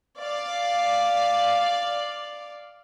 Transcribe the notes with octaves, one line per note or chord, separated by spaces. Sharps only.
D5 F5